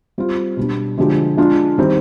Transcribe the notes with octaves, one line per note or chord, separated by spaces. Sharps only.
G3 C4 F4
B2 G3 D4
D3 F3 G#3 D4 G4
G#3 D4 F4
D#3 G3 C4